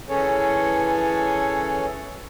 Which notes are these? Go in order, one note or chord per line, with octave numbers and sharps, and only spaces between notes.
E3 C#4 G#4 A4 C#5